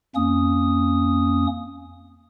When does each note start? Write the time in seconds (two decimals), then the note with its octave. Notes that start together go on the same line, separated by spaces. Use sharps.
0.15 F2 A#3 C#4 D#6